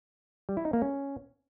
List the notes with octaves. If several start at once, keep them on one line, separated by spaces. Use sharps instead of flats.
G3
E4
D#4
A#3
C#4